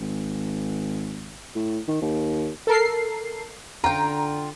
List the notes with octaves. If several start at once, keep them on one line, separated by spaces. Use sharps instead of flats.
G#1
A2
D#3
D#2
A4 A#4 C7
D3 F4 G5 A#5